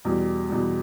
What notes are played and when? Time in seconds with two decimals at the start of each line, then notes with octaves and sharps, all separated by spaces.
0.05 E2 B2 G3
0.50 E2 B2 G3